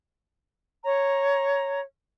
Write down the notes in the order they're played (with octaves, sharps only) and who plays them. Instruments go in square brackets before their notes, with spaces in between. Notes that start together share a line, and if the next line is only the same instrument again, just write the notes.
[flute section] C#5 A#5